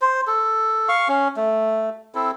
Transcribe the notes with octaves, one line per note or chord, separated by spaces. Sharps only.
C5
A4
F5 C#6
C#4
A3
C4 E4 A4